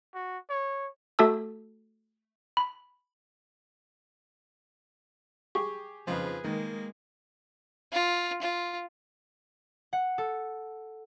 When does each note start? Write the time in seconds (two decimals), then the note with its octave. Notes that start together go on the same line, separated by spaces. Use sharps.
0.15 F#4
0.50 C#5
1.19 A3 F#4 A4 A5 E6
2.57 B5
5.55 G4 G#4 C#6
6.07 F2 C#3 F3 D#4 G#4 B4
6.44 D#3 G#3 A#3
7.93 F4
8.42 F4
9.93 F#5
10.18 A4